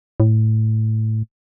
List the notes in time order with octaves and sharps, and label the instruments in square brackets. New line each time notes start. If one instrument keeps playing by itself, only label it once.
[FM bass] A2